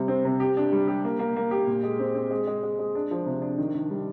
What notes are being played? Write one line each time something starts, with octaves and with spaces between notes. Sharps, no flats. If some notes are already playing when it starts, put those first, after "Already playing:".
Already playing: C3 G3
C4
C3
G4
D4
G3
G4
A#3
A#3
A#3
G4
A#2
G#3
C4
C4
G#3
G#3
G#3
G#3
D4
F3
C3
D4
D#3
D#3
G3